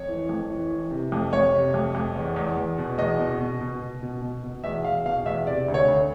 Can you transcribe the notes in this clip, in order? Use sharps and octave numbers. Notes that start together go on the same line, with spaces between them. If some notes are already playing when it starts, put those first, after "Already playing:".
Already playing: F2 C#5
E3
F2
E3
E3
C3
F2
F2 C#5
C3
F2
F2
E2
E2
E2
B2
E2 D#5
B2
B2
B2
B2
B2
B2
B2
E2 E5
E2 F5
B2 F5
E2 E5
C3 D5
D2
C#5
D2